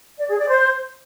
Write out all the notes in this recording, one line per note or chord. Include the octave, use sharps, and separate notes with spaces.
D5
G#4
D5
C5